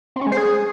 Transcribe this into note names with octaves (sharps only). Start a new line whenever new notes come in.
C4
C#4
G#3
C5
G#4